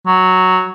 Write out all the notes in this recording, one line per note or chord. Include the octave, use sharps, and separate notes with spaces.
F#3